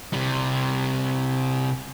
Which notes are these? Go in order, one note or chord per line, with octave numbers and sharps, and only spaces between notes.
C3 G3